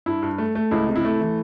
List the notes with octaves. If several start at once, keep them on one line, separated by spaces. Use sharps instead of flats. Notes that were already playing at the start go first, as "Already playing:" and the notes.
G2 E4
G2
A3
A3
C#2 E4
C3
E4
A3
E3